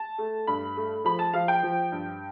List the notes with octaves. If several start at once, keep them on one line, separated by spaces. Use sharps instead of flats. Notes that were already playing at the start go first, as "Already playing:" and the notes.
Already playing: A5
A3
G2 B5
A3
F3 B5
A5
F3 F5
G5
F3
G2